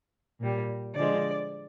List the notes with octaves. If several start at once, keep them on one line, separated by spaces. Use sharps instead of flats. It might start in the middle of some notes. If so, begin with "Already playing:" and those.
A#2 G3
D3 F3 G#3 D5